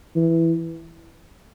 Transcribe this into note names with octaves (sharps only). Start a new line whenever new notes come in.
E3